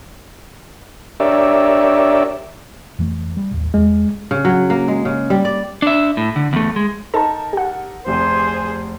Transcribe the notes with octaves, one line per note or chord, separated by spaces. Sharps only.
D4 G4 A#4 C#5 D5 E5
F2 E3 A3
G3
D1 A1 D#2
E2 G#3
C#3
F#3
A#3
G#3
C#3
G3
D5
D4 E5
A2
D3
E2 A3
G#3
D#4 A4 A#4 A5 A#5
G4 F#5
F1 C3 G#4 C5